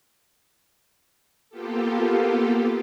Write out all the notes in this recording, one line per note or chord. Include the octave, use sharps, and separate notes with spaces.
A#3 B3 F4 G4 A4